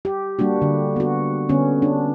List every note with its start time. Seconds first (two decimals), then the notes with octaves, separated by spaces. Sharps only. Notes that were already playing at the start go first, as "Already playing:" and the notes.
0.05 G4
0.39 G3 A#3 D4 F#4
0.62 D3
0.96 B3 F#4
1.49 D3 B3 C#4
1.82 D4